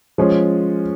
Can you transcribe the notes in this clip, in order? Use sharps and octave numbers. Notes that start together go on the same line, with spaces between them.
F3 G#3 C#4 F4